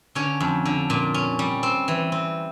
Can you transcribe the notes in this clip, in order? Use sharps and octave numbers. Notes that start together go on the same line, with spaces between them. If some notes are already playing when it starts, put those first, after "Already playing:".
D3 C#4 C#5
F2
D3
A#2
C#4
G3
C4
E3
C4